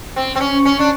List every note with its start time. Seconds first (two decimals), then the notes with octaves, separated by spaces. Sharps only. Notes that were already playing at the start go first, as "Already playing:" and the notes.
0.16 C4
0.35 C4
0.40 C#4
0.65 C#4
0.79 D4